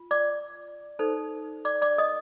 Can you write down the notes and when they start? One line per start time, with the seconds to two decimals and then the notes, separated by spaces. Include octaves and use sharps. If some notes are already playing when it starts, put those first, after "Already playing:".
Already playing: F4
0.11 D5 D6
0.99 D#4 A4 C5
1.65 D5 D6
1.82 D5 D6
1.98 D#5 D#6